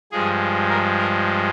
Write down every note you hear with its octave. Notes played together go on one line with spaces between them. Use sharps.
G2 F3 G#3 G#4
A#4
A#4